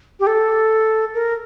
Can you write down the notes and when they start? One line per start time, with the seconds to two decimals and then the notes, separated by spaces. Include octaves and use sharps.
0.20 G4
0.27 A4
1.14 A#4